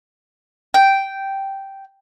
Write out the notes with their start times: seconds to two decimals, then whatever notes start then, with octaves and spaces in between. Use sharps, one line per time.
0.74 G5